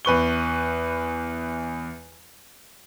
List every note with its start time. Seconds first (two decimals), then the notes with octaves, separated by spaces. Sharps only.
0.05 E2 B4 C#6 G7